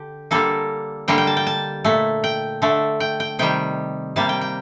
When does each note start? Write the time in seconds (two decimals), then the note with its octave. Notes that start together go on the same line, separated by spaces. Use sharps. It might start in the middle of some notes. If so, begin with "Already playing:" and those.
Already playing: D3 G4
0.31 D3 G3 A#3 A4
1.08 D3 G3 A#3 G5
1.18 G5
1.27 A5
1.37 G5
1.47 A5
1.85 A#2 A3
2.24 G5
2.62 D3 A3
3.00 G5
3.20 G5
3.39 C3 D#3 G3 G5
4.16 C3 G3 A#3 A5
4.29 G5
4.41 G5